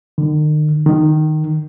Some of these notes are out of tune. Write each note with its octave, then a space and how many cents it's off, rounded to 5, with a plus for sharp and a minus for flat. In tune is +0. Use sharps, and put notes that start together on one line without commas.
D#3 -40
D#3 -10